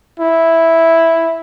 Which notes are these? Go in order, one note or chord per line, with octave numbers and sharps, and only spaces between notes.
E4